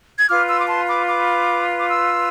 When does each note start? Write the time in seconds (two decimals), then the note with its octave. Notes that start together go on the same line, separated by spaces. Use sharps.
0.18 G#6
0.28 F4 B4 D6 F6
0.48 C6 E6
0.60 D6
0.68 A5 C6
0.88 B5 D6
1.08 B5 D6
1.77 D6
1.88 C6 E6